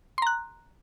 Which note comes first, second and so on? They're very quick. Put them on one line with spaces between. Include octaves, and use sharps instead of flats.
C6 A#5 F#6